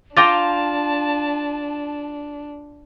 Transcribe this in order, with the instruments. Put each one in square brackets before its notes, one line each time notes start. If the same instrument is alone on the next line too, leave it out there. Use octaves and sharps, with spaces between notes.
[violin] D4 [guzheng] F4 G5 A#5 [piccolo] A5 [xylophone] D6 A6